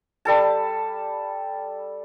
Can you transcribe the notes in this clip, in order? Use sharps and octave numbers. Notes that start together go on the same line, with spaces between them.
G3 A4 A5